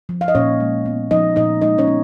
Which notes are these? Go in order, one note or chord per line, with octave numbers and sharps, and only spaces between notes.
F3
F5
D#5
A#2 C#4 C#5
G#3
B3
F3 D#4 D#5
A#2 D#4 D#5
G#3 D#4 D#5
C#4 C#5
B3